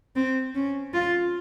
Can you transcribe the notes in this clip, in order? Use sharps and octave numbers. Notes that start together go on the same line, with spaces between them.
C4
C#4
F4